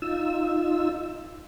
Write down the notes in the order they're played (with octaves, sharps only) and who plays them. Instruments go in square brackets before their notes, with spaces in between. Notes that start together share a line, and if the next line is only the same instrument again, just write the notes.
[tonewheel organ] D#4 F4 E6